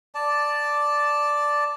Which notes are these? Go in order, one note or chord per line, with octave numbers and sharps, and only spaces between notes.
D5 A5